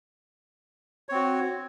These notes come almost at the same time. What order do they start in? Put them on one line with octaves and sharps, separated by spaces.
C#5 C4 F#4